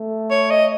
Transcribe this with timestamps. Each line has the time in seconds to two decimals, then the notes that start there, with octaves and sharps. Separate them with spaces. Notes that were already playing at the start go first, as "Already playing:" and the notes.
Already playing: A3
0.31 C#5
0.50 D#5